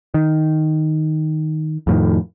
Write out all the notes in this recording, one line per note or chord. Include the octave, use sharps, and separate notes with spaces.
D#3
F2 A2 D#3